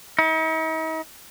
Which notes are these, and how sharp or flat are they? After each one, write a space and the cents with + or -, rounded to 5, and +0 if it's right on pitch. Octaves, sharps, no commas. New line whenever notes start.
D#4 +45